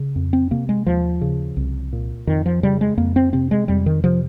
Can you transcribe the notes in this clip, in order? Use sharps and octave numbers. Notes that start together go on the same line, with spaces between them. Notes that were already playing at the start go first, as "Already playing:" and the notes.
Already playing: C#3
F2
C4
C3 A#3
G#3
D#2 F3
C#3
C2
A#2
F2 D#3
F3
C#3 G3
G#3
F2 A#3
C4
C3 C4
G#3
F2 G3
D#3
C3 F3